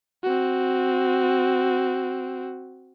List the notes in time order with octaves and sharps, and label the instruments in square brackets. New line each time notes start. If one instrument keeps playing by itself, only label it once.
[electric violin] C4 F#4